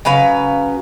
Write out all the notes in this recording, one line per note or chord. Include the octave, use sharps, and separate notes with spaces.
C#3 F#3 B4 F5